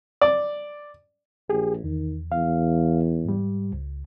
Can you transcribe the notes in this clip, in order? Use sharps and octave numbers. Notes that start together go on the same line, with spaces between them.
D5
A#1 G4 G#4
E2 D#3
E2 F5
G#2 G3
C#2